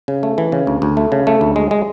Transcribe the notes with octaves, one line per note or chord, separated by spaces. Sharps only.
C#3
A3
E3
C#3
D2
D2
A3
C#3
A3
D2
G#3
G#3